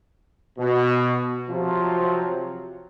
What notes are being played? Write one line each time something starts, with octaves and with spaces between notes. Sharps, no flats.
B2
C3 F3 F#3 F4